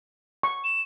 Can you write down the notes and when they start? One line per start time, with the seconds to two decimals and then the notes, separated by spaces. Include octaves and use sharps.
0.43 C#6
0.64 E7